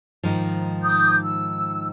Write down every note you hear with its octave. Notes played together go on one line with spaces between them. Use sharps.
G#2 D#3 F3
D6 D#6 G6
E6